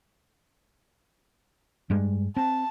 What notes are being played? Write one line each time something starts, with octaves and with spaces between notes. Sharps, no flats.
G2 G3 G#3
C4 A5